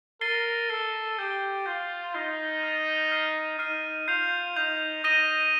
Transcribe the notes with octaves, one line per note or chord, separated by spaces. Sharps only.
A#4 A6 C7 D#7 G7
A4 A6 C7 D#7 G7
G4 G6 C7 G7
F4 G6 C7 G7
D#4 F6 A6 C7
F6 A6 C7
F6 C7 D#7
D#4 F6 C7 D#7
F4 G6 C7 F7
D#4 G6 C7 F7
D#4 D#6 A#6 D#7 G7